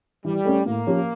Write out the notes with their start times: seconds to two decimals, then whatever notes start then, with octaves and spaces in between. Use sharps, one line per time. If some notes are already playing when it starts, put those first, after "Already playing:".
0.25 E3 G3
0.45 A3 C#4
0.65 A2 A#3
0.87 F3 C#4 G4 C#5